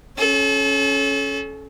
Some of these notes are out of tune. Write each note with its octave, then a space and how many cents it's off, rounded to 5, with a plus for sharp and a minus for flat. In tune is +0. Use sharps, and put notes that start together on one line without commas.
C#4 +0 A4 -35